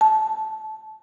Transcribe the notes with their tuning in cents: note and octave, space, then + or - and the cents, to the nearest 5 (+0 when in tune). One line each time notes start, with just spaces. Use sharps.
A5 -20